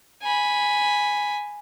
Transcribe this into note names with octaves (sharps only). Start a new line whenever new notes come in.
G#5 B5